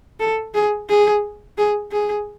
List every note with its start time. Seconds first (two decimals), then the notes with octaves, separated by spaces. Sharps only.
0.20 A4
0.55 G#4
0.89 G#4
1.58 G#4
1.92 G#4